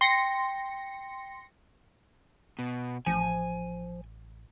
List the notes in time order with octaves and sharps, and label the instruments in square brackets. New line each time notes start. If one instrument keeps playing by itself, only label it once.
[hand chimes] G5 [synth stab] C6 A#6 C#7
[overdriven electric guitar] B2
[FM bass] A1 [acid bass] F3 [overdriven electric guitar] G#5